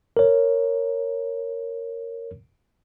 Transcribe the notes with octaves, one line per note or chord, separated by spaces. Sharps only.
A#4 C#5